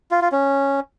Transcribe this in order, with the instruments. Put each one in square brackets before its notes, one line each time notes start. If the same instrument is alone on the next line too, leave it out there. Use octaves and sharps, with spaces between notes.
[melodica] F4
F4
C#4